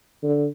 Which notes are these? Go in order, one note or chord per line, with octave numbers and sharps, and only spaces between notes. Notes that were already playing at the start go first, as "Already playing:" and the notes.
D3